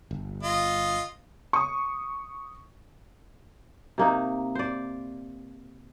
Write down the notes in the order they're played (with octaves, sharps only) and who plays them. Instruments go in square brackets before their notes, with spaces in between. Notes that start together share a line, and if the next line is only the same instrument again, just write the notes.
[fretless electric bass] G1
[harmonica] F4 D#5
[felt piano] C#6 D#6
[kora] C3 A#3 D#4
C5 D5